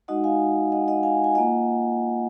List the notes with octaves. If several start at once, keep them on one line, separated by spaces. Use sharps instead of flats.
G#3 D#4 F#4 D#5 F#5
F5 G#5
D#5 F#5
D#5 F#5
F5 G#5
G#5
A#3 F4 D#5 F#5